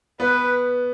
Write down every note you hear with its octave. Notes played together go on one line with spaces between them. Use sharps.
B3 B4